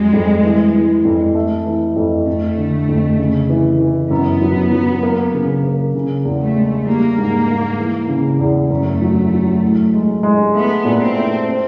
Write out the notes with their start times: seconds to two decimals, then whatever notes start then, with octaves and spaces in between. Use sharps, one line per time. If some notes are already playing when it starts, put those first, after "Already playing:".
Already playing: F2 F#3 G#3
0.13 F2
0.43 E3
0.75 E3
1.05 F2
1.35 A3
1.66 E3
1.96 F2
2.27 F2 A3
2.57 D3
2.88 F2
3.19 C#3
3.49 E3
3.80 E3
4.10 F#2 B3
4.41 F#3
4.72 F#3
5.03 A#3
5.34 C#3
5.64 A#3
5.94 C#3
6.25 E2
6.41 A3
6.55 G#3
6.86 G3 A#3
7.18 G#2
7.48 G#2
7.79 E3
8.09 C#3
8.39 E2
8.70 F#2 A3
9.02 F#3
9.32 F#3
9.63 A2
9.94 G#3
10.23 G#3
10.54 A3 B3
10.85 A#2
11.01 C4
11.15 A3
11.46 C4